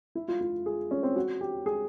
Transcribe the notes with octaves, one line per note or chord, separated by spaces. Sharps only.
E4
F4
F4
G#4
C#4
C4
F#4
G4
G#4